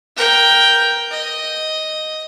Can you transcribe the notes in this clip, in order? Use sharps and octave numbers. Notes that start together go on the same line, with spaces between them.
A#4 G5
D#5